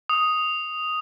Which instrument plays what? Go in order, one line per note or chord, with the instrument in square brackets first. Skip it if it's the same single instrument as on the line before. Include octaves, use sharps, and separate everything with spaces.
[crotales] D#6